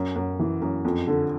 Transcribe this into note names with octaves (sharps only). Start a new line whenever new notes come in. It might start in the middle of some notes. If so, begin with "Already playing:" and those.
Already playing: F#2
F#2
E3
F#2
F2
D3